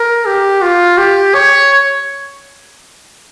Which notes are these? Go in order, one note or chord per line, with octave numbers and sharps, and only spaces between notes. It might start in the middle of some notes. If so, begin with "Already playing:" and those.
Already playing: A#4
G4
F4
G4
C#5